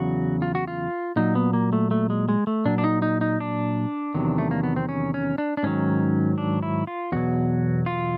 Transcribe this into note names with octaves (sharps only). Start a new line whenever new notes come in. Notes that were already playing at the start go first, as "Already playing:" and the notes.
Already playing: E2 C#3 F#3 F#4
F4
F#4
F4
A#2 F#3 D#4
B3
A#3
A3
A3
G#3
G#3
A3
A#2 F#3 D4
D4
D#4
D#4
D#4
D4
E2 C3 D#3 F#3
A3
A#3
B3
C4
C#4
C#4
D4
D4
G#2 D#3 F#3 C#4
D4
E4
F4
E2 B2 F#3 F#4
F4